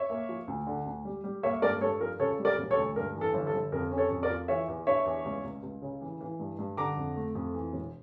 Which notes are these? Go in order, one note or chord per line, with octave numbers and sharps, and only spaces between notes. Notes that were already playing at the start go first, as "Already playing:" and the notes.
Already playing: C#5 E5
A#3
F3
D2
D3
D2
G3
G3
A#3 C#5 E5
G2 A#4 D5
G2 A4 C#5
F3 A#4
C#3 A4 C#5
G3
A#4 D5
E1
A4 C#5
D2
G2 A#4
E3
A4
G1
A4
G1
F2 A#4
C#4
A4 C#5
F2
A#4 D5
F3
E3 C#5 E5
E2
D4 C#5 E5
E2
C#2
C#2
C#2
C#3
E3
E3
G2
G2
D3 A#5 D6
F2
A3
F2
E3
E1